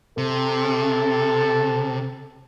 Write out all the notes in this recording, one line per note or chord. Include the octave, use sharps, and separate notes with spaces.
C3 A4